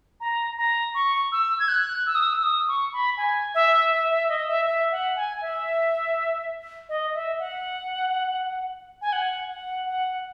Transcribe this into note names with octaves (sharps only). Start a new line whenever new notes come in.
A#5
A#5
C#6
E6
G#6
F#6
E6
D#6
E6
E6
D#6
C#6
B5
G#5
E5
E5
E5
D#5
E5
E5
F#5
G#5
E5
D#5
E5
F#5
G#5
F#5
F#5
F#5